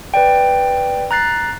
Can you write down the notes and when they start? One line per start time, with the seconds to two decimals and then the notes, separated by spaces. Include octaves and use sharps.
0.14 B4 D5 G5
1.11 A#5 F#6 A6 C7